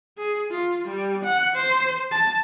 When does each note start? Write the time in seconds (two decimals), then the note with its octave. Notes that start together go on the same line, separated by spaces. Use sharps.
0.18 G#4
0.50 F4
0.88 G3
1.24 F#5
1.56 C5
2.11 A5